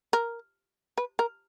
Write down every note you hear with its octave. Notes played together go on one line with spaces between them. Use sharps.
A#4
B4
A#4